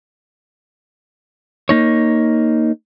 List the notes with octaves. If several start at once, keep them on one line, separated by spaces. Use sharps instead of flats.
A#3 D#4 C#5